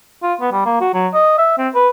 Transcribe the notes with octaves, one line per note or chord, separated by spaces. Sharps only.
F4
B3
G3
A#3
F#4
F#3
D#5
E5
C4
B4